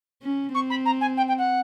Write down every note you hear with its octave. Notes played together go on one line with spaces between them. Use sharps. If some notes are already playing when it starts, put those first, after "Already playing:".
C#4
C4 C#6
B5
A#5
G#5
G5
G5
F#5